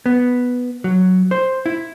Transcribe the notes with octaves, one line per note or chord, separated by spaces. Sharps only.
B3
F#3
C5
E4